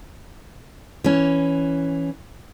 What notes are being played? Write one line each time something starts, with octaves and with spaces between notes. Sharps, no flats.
E3 C#4